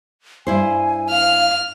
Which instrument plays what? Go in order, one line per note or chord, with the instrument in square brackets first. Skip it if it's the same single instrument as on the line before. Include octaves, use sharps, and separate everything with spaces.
[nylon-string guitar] G2 E4 C5 [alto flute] G#5
[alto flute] F5 [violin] F6